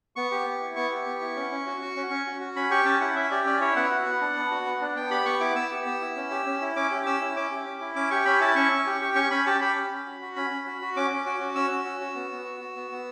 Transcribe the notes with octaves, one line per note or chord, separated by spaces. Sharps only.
B3 C#6
G4
B3
E4
B3 C#6
G4
B3
E4
C#4
C#4
F#4
F#4
C#4
C#4
F#4
F#4
C#4 B5
G4 C#6
C#4 A5
E4 F#5
C#4 E5
G4 D5
C#4 D5
E4 C#5
B3 F#5
F#4
B3
D4
B3
F#4
B3
D4
B3 G5
G4 B5
B3 C#6
E4 D6
B3 E6
G4
B3
E4
C#4
G4
C#4
E4
C#4 D6
G4
C#4 E6
E4
C#4 D6
G4
C#4
E4
C#4 D6
G4 C#6
C#4 B5
E4 A5
C#4 C#6
C#4
G4
G4
C#4 C#6
C#4 B5
G4 A5
G4 B5
C#4
C#4
F#4
F#4
C#4 B5
C#4
F#4
F#4
C#4 D6
C#4
F#4
F#4
C#4 E6
C#4
F#4
F#4
B3
B3
F#4
F#4
B3
B3